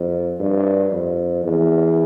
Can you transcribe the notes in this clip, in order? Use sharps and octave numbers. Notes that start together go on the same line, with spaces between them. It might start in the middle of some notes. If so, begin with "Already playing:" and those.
Already playing: F2
G2
F2
E2